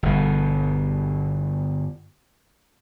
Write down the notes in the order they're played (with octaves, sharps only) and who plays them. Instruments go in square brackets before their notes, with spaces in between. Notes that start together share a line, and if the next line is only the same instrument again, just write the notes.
[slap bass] G1 B2